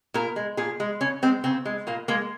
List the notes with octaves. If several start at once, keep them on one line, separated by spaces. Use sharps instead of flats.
A#2 A#4
G#3
A#2 G#4
G#3
C#3 C#4
G#3 C4
C#3 C4
G#3
A#2 A#3
G#3 A#3